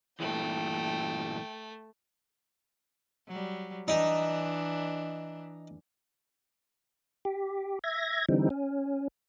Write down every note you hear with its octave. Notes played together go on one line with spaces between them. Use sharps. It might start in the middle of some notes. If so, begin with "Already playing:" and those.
G2 A#2 E3 A3 G5
F#3 G3
E3 D4 D#4
G4
E5 G#6 A#6
D3 E3 G3 C4 D#4
C#4